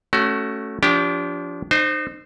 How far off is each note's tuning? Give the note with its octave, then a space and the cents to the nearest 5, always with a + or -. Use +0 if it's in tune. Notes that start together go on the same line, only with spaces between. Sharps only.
A3 +0 C#4 +0 F#4 +25
F3 +0 D4 -35 G4 +0
D#4 -35 C5 +0